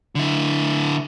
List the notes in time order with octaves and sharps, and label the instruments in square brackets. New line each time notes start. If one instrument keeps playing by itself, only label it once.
[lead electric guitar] D3 E4